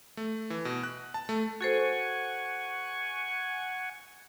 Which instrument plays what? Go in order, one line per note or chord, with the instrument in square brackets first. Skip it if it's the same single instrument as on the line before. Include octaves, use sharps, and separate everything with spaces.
[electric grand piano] A3
E3
B2
F#6
A5
A3
[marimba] F#4 A4 C5 [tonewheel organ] F#5 G#5 C#6